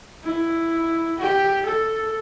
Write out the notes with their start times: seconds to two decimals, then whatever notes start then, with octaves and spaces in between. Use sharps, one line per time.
0.24 E4
1.19 G4
1.66 A4